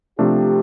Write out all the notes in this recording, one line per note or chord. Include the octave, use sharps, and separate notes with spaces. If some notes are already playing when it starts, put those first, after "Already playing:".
C3 F3 A3 D4 G4